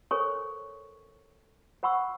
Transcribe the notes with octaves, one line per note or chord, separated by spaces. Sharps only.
A4 A#4 C5 C#5 G#5 C#6
C5 F#5 B5 C#6 E6